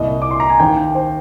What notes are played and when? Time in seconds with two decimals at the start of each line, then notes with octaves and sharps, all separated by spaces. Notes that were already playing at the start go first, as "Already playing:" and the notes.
Already playing: C2 A#2 D#5
0.22 D6
0.31 C6
0.40 A#5
0.50 G#5
0.59 D#2 D#3 G5
0.77 G5
0.94 C5